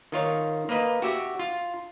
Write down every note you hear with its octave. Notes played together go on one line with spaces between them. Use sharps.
D#3 F4 C#5
A#3 B4 D#5
F#4 G4 E5
F4